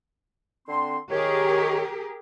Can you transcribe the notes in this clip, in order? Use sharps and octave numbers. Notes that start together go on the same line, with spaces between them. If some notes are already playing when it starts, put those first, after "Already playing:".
D3 C4 C6
D#3 G4 G#4 A#4 C#5